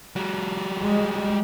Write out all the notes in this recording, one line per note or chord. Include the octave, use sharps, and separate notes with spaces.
G3 F#4
G#3